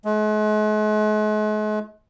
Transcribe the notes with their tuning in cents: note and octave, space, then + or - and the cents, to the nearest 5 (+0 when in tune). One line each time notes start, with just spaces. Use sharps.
G#3 +45